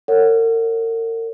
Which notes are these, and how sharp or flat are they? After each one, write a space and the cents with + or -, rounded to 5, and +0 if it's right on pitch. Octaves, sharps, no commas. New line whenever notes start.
A#4 -40 C#5 +0 F#5 +0